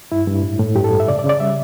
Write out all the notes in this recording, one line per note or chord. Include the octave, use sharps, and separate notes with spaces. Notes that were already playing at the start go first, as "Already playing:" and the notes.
G2 E4
G2
A2
A2
G2 G4
A4
G2
E5
C#3 D5
D5
C#3
D5
G3 E5